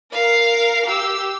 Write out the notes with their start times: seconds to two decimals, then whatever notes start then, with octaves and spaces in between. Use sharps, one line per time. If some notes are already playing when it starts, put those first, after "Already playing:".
0.13 A#4 F5
0.85 G4 E6